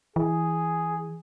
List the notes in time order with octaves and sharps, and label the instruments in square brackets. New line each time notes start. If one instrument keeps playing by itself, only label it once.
[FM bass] E3 [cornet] G#4